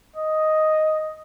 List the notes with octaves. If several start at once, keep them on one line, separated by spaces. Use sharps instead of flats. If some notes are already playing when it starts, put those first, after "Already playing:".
D#5